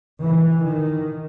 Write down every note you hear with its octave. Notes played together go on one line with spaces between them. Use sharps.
E3
D#3